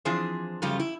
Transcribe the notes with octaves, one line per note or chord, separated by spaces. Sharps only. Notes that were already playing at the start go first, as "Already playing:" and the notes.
E3 F3 C4 D4 G#4 C5
F#2 C#3 F3 G3 A3 F4
E4